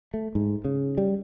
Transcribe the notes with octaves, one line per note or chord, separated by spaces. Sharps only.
A3
G#2
C#3
G3